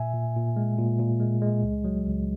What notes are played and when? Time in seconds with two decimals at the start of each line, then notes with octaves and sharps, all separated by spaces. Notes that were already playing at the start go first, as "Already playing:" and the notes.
Already playing: A#2 E5 G#5
0.14 A#2
0.36 A#2
0.57 G#3
0.78 A#2
0.99 A#2
1.20 G#3
1.42 G#3
1.63 C#2
1.85 F#3
2.05 C#2